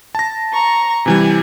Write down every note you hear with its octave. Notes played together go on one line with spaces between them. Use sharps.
A5 A#6
A#5 C#6
C3 E3 G3 G#5